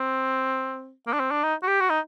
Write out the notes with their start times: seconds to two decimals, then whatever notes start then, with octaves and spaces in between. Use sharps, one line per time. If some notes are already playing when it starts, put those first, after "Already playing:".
Already playing: C4
1.08 A#3
1.13 D4
1.20 C4
1.31 D4
1.43 D#4
1.63 F#4
1.68 G4
1.80 F#4
1.90 D#4